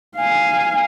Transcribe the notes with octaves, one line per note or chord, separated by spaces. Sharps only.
F5 G#5